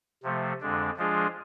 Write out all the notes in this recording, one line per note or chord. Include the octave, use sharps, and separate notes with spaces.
C3 F3 A3
F2 D3 G#3 D4
F3 G#3 D4 F4 G#4